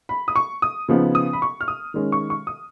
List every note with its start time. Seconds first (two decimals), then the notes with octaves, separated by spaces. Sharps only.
0.09 B5
0.28 D#6
0.36 C#6
0.62 D#6
0.88 C#3 F3 B3 D#4
1.15 D#6
1.33 B5
1.42 C#6
1.61 F6
1.68 D#6
1.94 D#3 G#3 C#4
2.12 C#6
2.30 C#6
2.47 D#6